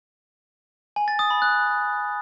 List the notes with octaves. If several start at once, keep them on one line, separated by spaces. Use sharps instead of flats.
G#5
A6
D#6
B5
F#6